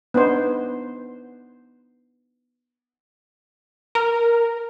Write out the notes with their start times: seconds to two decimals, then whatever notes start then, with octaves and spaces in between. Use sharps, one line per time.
0.14 B3 D4 D#4 C5
3.95 A#4